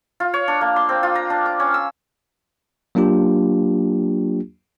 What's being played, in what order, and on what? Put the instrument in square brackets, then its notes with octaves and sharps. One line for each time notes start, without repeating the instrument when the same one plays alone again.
[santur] F4
C#5
D4
A#3
C6
C4
F4
A#5
D4
D6
C#4
E6
[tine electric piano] F#3 A#3 D4 F4 G4